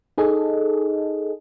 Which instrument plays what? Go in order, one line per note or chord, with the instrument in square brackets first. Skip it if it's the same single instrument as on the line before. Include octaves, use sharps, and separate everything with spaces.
[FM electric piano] D#4 G#4 A4 D#5